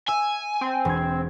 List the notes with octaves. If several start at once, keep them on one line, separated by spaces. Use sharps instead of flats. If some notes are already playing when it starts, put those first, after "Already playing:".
E5 G#5 E6
C4
E1 G#6